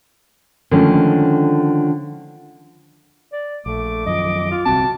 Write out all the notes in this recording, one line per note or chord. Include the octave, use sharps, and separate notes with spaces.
D3 D#3 F3 G#3 A3 C#4
D5
A#1 A3 D6
F#2 D#3 F3 D#5
F4
D#1 C2 C4 F#4 A5